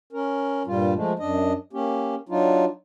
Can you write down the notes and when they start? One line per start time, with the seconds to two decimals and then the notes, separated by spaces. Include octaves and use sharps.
0.13 C#4 A#4
0.66 G2 A#2 G3 F4
0.95 F3 G#3 A3
1.19 F#2 D4 D#5
1.73 A#3 C#4 G4
2.29 F#3 D4 D#4 F4